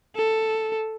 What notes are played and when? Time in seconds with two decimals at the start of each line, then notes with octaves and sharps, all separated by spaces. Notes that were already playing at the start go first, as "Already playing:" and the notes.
0.16 A4